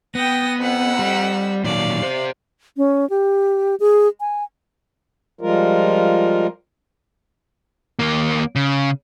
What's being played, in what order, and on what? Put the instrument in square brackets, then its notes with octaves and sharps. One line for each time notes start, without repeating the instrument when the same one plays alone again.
[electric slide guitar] B3 [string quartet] G5 D#6 A#6
[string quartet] F2 F#5 E6
[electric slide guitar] G3
[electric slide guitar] A#2 D#3 F#3 [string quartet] D5 F5
[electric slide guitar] G4 C5
[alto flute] C#4
G4
G#4
G#5
[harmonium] F3 G3 G#3 F4 A#4
[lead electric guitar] D#2 A#3
C#3